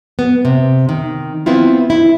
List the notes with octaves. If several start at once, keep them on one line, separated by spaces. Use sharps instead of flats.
B3
C3
D#3
B3 C4 E4 F4
E4